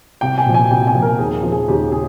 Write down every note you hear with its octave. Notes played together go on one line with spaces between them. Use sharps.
C2 G5
G#5
A#2 F3
G#5
C2 G5
G#5
A#2 F3
A#4
D#2 G#4
C#3 F3
G#4
D#2 G4
C#3 G#4